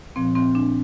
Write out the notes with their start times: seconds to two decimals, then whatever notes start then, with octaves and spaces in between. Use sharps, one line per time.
0.16 A#2 F3 C4
0.35 C4
0.55 D4